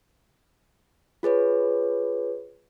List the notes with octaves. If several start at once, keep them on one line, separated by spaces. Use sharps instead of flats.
F4 G#4 B4 C#5